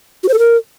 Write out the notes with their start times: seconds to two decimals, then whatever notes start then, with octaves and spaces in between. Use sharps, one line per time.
0.24 F#4
0.29 C5
0.34 A4
0.39 A#4